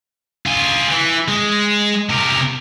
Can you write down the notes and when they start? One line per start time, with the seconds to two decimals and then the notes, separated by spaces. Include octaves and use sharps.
0.46 F4 G#4
0.91 E3
1.28 G#3
2.10 C3 A#4